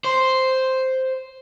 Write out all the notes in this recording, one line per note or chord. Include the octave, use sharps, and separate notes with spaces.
C5